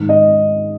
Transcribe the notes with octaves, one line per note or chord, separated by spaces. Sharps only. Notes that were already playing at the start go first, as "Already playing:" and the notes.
Already playing: G#2 D#3
D#5